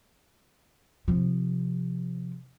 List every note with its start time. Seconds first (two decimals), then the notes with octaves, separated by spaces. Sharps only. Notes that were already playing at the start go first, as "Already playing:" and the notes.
1.08 C3 F3